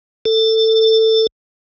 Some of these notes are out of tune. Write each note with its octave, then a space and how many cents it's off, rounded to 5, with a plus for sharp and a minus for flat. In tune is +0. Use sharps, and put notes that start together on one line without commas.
A4 +15